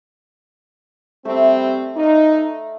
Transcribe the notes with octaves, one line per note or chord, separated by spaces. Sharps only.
G3 A3 C4 E5 A5
D#4 D5 F5